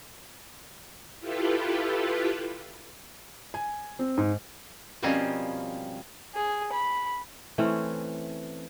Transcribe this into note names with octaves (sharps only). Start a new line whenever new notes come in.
E4 F4 G4 A4 B4
G#5
C4
G#2
B2 F3 G3 A#3 C4 C#4
G#4
B5
E3 A3 C4 C#4